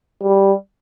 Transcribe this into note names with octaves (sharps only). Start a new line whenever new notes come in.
G3